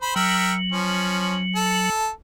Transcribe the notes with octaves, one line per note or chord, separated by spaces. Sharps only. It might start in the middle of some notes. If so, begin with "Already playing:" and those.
C5 B5
F#3 A#4 E5 G5
F3 C#4
A4